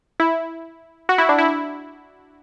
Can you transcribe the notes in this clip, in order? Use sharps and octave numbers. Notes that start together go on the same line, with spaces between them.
E4
F#4
E4
D4
E4